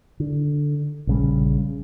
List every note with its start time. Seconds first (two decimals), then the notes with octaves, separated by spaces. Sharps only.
0.20 D3
1.07 A#1 C#3 G3